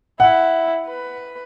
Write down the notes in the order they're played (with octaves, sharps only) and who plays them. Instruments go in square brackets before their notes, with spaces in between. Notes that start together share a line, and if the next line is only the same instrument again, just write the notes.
[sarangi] E4 [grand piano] F#5
[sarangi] B4